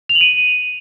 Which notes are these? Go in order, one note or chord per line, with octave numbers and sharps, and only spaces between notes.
F7
F#7
D#7